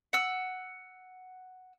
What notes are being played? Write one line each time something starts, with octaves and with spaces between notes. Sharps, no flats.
F#5 E6